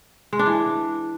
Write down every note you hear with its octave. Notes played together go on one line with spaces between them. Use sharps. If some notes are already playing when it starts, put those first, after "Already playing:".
G#3
D4
E3